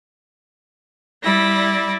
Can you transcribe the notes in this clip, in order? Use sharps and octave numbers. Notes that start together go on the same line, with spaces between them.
G3 E4 D5 A#6